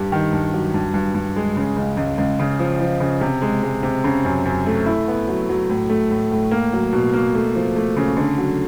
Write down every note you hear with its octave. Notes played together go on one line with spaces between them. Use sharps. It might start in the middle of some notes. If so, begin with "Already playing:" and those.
Already playing: G2 G4
D#3
G2
F#3
G2
G2
G2
G#3
C#3
C#2
C#2
C#2
C#3
F3
F3
C#3
C3
G#3
G#3
C3
C#3
F#2
F#2
A3
E4
B3
F#3
F#3
A2
A3
A2
A2
A#3
F#3
B2
A#3
A3
F3
A3
C#3
D3
F#3